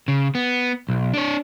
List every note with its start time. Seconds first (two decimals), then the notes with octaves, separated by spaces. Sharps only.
0.08 C#3
0.35 B3
0.89 B1
1.14 D4 C#5